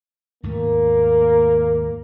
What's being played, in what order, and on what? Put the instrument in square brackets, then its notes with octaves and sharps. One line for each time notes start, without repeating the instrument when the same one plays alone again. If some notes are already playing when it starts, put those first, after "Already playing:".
[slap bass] D#2 G#2 A3 [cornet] A#3